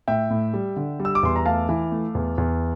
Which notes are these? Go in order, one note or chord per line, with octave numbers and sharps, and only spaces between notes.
A2 E5 G5
A2
G3
D3
G3
E6
D6
E2 C6
A#5
A3 F5 A5
E3
A3
E2
E2